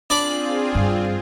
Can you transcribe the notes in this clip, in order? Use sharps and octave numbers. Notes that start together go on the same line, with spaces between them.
C4 D4 F4 G#4 B5 D6
G2